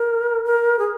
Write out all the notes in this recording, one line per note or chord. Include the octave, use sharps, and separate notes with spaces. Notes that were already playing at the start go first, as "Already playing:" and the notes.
Already playing: A#4
A#4
G#4